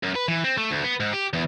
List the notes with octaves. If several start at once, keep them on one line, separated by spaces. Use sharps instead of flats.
F#2
B4
E3
C4
A3
D2
B3
G#2
G4
E2